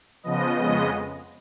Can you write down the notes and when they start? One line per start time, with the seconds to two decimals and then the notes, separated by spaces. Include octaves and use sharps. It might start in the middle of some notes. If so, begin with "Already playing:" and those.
0.23 C#3 F3 B3 D#5
0.56 F2 C#3 G#3 B3 D#5